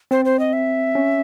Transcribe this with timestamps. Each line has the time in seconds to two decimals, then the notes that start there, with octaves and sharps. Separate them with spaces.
0.11 C4 C5
0.25 C5
0.39 D#5
0.53 E5
0.95 C#4